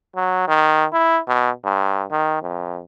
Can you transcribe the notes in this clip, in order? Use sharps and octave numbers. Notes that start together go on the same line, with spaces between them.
F#3
D#3
E4
B2
G2
D#3
F2